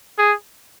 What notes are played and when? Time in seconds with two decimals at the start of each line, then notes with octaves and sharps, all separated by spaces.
0.18 G#4